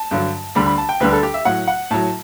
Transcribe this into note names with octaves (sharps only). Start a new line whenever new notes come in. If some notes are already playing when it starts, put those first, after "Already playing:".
Already playing: A5
G2 D3 F#3
D2 D3 G3 B5
B5
A5
G5
D2 D3 G3 B4
A4
G4
E5
A2 F#3 F#5
F#5
A2 F#3 A5